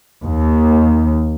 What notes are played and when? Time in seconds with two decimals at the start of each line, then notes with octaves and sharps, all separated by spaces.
0.24 D#2